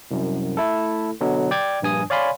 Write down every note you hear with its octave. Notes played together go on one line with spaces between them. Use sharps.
C2 F#2
A3 E4 A4
B2 D3 F#3
D5 G5 D6 G#6
A#1 G2 G#5 D#6
C#5 D5 F5 G#5 B5 C6